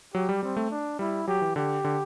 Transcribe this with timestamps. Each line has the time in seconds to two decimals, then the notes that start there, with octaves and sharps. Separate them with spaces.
0.14 F#3 G4
0.29 G3
0.43 G3 C4
0.57 A3
0.70 D4
0.99 G3 E4
1.27 F#3 G4
1.41 E3
1.56 D3 G4
1.84 D3